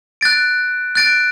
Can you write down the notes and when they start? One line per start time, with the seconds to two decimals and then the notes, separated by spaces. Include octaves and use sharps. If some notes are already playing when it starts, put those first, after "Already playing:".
0.21 F#6 A6 D7
0.95 F#6 A6 D7